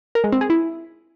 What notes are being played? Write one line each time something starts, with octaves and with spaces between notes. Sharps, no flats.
A#4
G#3
C4
G#4
E4